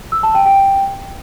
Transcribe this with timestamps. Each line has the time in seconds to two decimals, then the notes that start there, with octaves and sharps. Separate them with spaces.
0.12 E6
0.23 A5
0.35 G5
0.46 G5